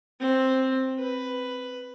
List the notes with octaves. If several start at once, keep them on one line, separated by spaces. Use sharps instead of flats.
C4
B4